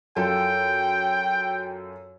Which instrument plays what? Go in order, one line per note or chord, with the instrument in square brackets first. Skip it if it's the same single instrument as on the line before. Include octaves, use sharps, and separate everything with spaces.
[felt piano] F#2 F4 A4 [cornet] G5